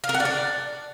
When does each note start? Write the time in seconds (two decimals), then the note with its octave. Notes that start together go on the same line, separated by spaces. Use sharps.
0.04 F5
0.09 A#4
0.14 F#5
0.20 D5
0.25 D4